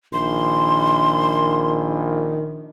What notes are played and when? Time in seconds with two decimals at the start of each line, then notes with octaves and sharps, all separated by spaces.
0.13 A#1 D#3 C6